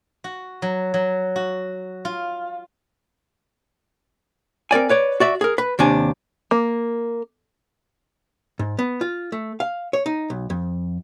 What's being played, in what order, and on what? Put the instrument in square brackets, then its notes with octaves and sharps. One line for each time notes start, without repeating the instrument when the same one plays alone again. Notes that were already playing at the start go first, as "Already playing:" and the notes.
[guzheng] F#4
F#3
F#3
F#4
F4
[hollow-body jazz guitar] C4 A#4 D5 G#5
B4 C#5 D5
F#4 D5 E5
G#4 A#4
B4
D#2 C3 D4 G#5
[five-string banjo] A#3
[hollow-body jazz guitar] G#2
B3
F4
A3
F5
C#5
D#4
B1
F2